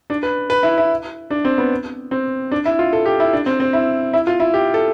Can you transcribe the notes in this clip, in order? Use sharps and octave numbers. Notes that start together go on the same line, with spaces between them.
D4
B4
B4
E4
E4
D4
C4
B3
C4
D4
E4
F4
A4
G4
E4
D4
C4
C4
E4
E4
F4
E4
G4
A4